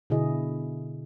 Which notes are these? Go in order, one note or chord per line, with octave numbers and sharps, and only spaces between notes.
B2 D3 E4 G#4 D#5